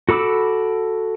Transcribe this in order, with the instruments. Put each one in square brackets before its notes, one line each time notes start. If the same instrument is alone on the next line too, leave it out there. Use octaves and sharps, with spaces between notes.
[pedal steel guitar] F#4 A4 B5 D6 E6